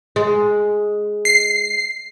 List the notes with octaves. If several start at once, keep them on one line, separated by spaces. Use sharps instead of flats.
G#3
C7